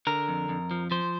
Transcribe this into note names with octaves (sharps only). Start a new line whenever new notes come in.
D3 A#4
F2
F2
F3
F3 C5